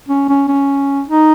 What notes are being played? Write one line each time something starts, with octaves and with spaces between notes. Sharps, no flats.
C#4
C#4
C#4
D#4